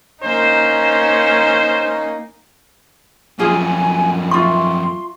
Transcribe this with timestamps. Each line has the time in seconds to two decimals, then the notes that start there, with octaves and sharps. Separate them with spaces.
0.23 A#3 C#4 D#4 C5
3.39 F#2 F3 C#4 F4 G#4 G#5
4.31 F4 E5 C6 C#6